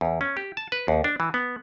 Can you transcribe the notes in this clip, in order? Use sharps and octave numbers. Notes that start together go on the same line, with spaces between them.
E2
C#4
G4
A5
B4
D#2
D4
E3
B3